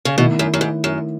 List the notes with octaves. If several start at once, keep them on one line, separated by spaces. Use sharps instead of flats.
C#3
B2 D#3 A3 E4
F#2
F#2
G#2
F#2